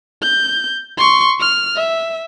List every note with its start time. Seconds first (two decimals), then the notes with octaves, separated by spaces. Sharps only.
0.22 G6
0.98 C6 C#6
1.40 F6
1.76 E5